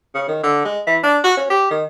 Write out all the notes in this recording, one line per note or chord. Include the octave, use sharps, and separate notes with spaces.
C#3
D#3
D3
G#3
E3
D4
F#4
C#4
G4
D#3